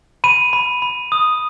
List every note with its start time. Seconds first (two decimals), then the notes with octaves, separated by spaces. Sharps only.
0.24 B5 D#7
0.53 B5
0.82 B5
1.12 D#6